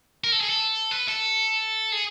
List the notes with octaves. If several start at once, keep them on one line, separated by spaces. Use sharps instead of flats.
A#4
A4
G#4
A4
B4
A4
G#4